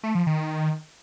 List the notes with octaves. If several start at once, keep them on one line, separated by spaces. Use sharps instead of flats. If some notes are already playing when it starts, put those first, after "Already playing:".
A3
F3
D#3